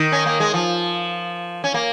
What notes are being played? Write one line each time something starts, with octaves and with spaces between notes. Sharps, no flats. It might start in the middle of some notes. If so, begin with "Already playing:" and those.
Already playing: D#3
C#4
A#3
G#3
F3
C#4
A#3